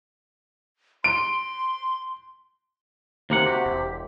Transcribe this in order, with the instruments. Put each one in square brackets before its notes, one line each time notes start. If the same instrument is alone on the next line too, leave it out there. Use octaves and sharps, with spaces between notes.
[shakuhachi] C6 [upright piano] D7
[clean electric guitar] D#2 A#3 F#5 [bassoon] C3
[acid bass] F#4 [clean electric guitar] G4
[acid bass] E1